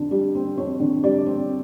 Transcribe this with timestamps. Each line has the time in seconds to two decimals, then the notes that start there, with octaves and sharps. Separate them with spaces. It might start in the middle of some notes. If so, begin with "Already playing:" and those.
Already playing: F2 D3
0.11 G3
0.35 C4
0.57 F2 C#5
0.80 D3
1.04 G3 D5
1.26 C4